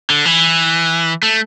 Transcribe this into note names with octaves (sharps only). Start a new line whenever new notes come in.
D3
E3
A3